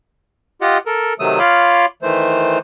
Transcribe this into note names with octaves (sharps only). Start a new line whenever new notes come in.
F4 G4 D#5 F#5
A4 A#4
C3 D#3 F#3 A3 D#6 E6
F4 C#5 F5 B5 C6 D6
D#3 E3 A3 C5